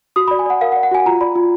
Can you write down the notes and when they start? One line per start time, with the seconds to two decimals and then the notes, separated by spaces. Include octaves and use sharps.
0.16 F#4 D#6
0.28 D5 B5
0.39 G#5
0.46 D5 F#5
0.61 A#4 F5
0.72 F#5
0.76 D5
0.83 F#5
0.91 F#4 G#5
1.06 F4 A#5
1.21 D5 B5
1.35 F4